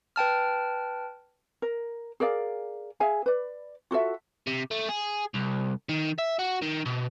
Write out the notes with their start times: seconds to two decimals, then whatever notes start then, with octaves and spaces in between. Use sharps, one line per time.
0.16 B4 G5 A5 F6
1.62 A#4
2.20 G#4 A#4 D5 F5
3.00 G#4 E5 F5 G#5
3.26 B4 D5
3.91 F4 F#4 A4 E5
4.47 C3
4.71 A3
4.89 G#4
5.35 C2
5.89 D#3
6.18 E5
6.39 F#4
6.62 D#3
6.86 B2